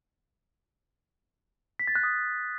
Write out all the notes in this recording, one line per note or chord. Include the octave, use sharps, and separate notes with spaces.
B6
A6
F#6
D#6